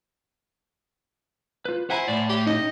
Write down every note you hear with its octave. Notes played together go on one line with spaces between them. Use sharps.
F4 B4
E4 C5 F#5 G#5 A#5
A2 D5
G4
C#4 D#4 D#5